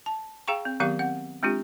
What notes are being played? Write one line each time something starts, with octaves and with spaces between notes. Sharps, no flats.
A5
G#4 F5 G5 A#5 C#6
C4
D#3 F#3 B3 G4 F5 C#6
C4 F#5
G#3 C4 D4 F4 G4